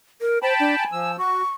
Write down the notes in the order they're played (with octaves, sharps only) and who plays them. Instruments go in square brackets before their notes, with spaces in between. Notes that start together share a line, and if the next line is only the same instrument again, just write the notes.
[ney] A#4
[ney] C5 [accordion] G5 A5 B5
[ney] D4
G#5
[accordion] F3 E6
[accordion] F#4 [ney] C#6